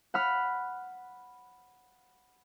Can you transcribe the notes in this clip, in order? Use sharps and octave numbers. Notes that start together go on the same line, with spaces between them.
F#5 B5 F6